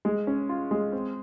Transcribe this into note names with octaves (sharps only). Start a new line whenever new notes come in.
G#3
C#4
F4
G#3
C4